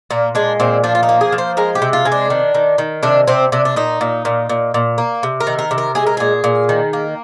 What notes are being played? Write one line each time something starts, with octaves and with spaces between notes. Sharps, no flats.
A#2 A#3
G#3 D4
A#2 C4
F3 D4
F4
D#4
A#3
G#4
F3
C5
G#3 A#4
G4
C3
F4
G#3
D4
D#3
D#3
D#3
C3 D4
C3 C4
C3 D4
D4
A#2 D#4
A#2
A#2
A#2
A#2
A#3
C3
A#4
D#3
A#4
C3
A#4
G#3 G#4
A#4
A#2 G#4
A#2
D#3
A#3